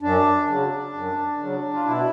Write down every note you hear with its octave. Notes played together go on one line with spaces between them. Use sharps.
F#2 D4
C#3 F#3
F#2
C#3 F#3
F4
B2 E4